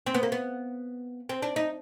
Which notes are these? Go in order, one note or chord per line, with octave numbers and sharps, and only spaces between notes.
C4
B3
A#3
B3
C4
D4
D#4